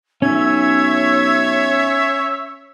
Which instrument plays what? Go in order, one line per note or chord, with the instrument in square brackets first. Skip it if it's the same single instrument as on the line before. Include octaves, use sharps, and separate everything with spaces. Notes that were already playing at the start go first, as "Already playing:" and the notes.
[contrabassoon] B1 [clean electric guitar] C#4 [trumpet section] C#5 E5 [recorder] G#6